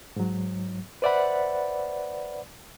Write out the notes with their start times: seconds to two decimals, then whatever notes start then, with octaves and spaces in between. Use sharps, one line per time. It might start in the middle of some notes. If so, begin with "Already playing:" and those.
0.16 G#2 F#3
1.02 B4 C5 D5 E5 F#5 B5